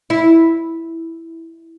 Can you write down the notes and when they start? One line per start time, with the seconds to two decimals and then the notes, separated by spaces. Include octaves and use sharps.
0.10 E4